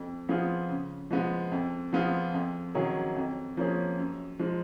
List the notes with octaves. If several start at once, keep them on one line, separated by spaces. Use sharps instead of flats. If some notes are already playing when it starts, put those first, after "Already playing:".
Already playing: F2
F3 B3 F4 G#4
C#3
F3 G#3 B3
F2
F3 B3 F4 G#4
F2
D#3 F#3 C#4 G#4
F2
F3 A#3 C#4 G#4
F#2
F3 G#3